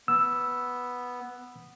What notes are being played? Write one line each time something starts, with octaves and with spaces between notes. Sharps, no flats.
B3 E6